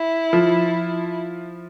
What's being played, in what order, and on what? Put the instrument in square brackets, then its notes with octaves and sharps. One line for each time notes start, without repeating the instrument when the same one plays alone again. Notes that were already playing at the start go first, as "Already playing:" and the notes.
Already playing: [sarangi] E4
[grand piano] F3